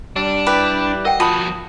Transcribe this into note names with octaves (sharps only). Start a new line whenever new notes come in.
G3 D4
E4 G4 B4
A#4 D#5 F#5 G5
F3 F4 F#4 A5 B5 D#6